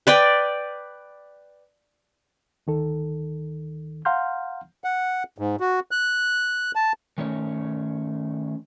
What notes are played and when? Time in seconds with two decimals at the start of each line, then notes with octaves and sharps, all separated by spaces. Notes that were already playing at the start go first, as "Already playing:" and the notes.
0.07 B4 D5 G5
2.67 D2 D#3 A4
4.05 F5 F#5 A#5 C6 F6 G6
4.84 F#5
5.38 G#2
5.60 F#4
5.91 F#6
6.75 A5
7.18 D#3 A3 C#4 C#5